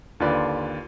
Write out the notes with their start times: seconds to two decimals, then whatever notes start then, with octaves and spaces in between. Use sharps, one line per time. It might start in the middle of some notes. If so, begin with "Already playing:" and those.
0.20 D#2 D3 F4 B4 D5